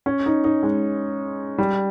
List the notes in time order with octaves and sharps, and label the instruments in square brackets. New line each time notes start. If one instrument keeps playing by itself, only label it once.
[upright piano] C#4
D#4
D#4
G#3
G3